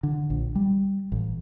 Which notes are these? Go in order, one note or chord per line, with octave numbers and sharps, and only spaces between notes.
D3
A#1
G3
A1